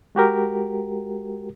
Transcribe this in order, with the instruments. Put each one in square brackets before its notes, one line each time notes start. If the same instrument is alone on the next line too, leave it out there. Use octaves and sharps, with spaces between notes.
[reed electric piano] G#3 F#4 G4 A#4